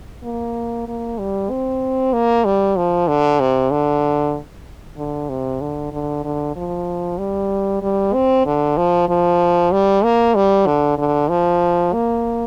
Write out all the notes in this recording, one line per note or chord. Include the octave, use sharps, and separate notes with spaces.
A#3
A#3
G3
C4
A#3
G3
F3
D3
C3
D3
D3
C3
D3
D3
D3
F3
G3
G3
C4
D3
F3
F3
G3
A#3
G3
D3
D3
F3
A#3